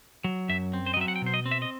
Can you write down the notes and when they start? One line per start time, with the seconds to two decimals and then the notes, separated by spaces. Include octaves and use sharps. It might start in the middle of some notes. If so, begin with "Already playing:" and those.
0.24 F#3
0.49 F#2 E5
0.73 C4
0.86 C5
0.94 D#5
0.97 F#3 E5
1.08 F#5
1.16 G5
1.22 B2 C5
1.34 D#5
1.46 C4
1.51 E5
1.62 D#5